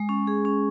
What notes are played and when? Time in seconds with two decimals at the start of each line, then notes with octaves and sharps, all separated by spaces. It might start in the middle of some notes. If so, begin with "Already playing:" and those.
Already playing: G#3
0.09 C#4
0.27 G#4
0.45 C#4